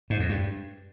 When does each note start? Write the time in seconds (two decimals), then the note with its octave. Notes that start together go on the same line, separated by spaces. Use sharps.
0.10 G#2
0.20 F2
0.29 G2